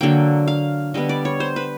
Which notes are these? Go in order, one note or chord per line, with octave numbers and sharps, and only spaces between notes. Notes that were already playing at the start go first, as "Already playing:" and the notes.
D3 F#3 A#3 G5
F5
D3 G3 B3 D#5
D5
C#5
C5
B4